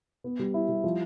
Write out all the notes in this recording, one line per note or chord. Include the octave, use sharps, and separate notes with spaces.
B3
G3
E4
G3
F3